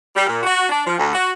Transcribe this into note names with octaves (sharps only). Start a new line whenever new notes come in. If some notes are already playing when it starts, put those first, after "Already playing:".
G3
A#2
F#4
D4
F3
D2
F#4